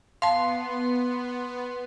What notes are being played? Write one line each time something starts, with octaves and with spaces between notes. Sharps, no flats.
B3 F5 A5 C6